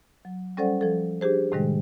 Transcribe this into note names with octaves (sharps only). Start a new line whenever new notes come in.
F#3
G3 C#4 A4 C5 D5 F#5
F3 A4
D4 G4 G#4 C5
A2 C3 D#3 G3 G#3